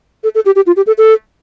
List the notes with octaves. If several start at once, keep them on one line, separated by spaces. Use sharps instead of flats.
A4
A4
G4
G4
F4
G4
A4
A4